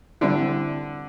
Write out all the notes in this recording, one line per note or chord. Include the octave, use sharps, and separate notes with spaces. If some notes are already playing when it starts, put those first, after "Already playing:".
D3 G3 C4 E4